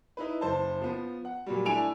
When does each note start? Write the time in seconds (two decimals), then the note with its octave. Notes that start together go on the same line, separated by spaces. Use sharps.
0.17 D#4 E4 B4
0.41 F#1 C5 A5
0.81 F3 B3
1.25 F#5
1.46 A#2 F#3 G3
1.65 A3 D4 E4 G#5 D7 F7